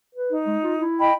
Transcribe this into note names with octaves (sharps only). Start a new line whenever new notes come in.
B4
D#4
G#3
F4
E4
D#5 G5 B5